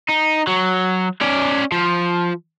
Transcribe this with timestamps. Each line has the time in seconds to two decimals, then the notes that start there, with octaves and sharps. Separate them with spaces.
0.08 D#4
0.47 F#3
1.21 C#4 D5
1.72 F3